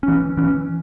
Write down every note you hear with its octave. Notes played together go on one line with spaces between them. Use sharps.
E3 C#4
E3 C#4